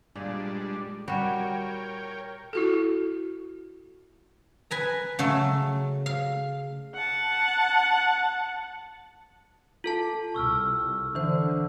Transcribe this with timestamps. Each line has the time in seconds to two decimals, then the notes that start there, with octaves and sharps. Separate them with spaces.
0.16 A#2 G3 G#3 D4
1.08 G3 F#4 A#4 C#5 G5
2.53 E4 F#4 A4
4.71 B4 G#5 A#5
5.19 C#3 F#3 A3
6.06 F5
6.94 F#5 A5
9.84 F4 A4 A5
10.34 C2 C#6 E6 F6
11.15 D3 E3 C5